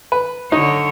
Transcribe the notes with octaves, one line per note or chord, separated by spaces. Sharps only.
B4
D3 D#4 C#5